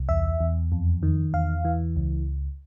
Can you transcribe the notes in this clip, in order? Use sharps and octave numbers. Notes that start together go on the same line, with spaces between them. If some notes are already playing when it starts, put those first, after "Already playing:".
Already playing: C2
E2 E5
E2
F2
D#3
E2 F5
E3
C#2